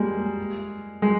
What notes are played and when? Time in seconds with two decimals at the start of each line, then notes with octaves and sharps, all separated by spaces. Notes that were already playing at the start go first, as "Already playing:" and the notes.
Already playing: G3 G#3 A#3
1.02 G#3